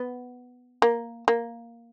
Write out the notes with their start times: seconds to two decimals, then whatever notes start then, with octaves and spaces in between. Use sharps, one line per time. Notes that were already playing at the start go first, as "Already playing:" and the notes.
Already playing: B3
0.82 A#3
1.28 A#3